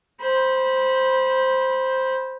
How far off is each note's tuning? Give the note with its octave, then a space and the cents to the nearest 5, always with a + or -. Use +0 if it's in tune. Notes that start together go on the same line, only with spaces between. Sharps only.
C5 +0 B5 -20